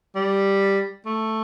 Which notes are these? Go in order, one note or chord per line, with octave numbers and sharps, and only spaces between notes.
G3
A3